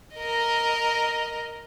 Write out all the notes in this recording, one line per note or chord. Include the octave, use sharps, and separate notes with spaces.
A#4 D#5